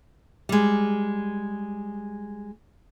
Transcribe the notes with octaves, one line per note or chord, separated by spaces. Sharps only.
G3 G#3